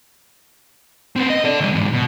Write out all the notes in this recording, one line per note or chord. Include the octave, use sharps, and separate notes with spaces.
B3 C4
D#5
A4 D5
D2 G3
E2 G#2
B2